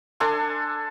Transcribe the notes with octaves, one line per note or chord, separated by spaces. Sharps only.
D4 A4 G#5 C6